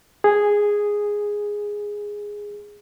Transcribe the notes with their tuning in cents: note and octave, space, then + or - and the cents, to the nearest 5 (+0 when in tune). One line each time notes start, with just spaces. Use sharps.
G#4 -5